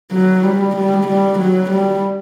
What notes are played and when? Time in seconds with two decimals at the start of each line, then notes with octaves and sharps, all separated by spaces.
0.12 F#3
0.43 G3
0.76 G3
1.08 G3
1.39 F#3
1.71 G3